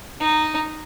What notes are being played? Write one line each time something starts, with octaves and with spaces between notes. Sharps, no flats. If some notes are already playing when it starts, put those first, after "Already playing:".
D#4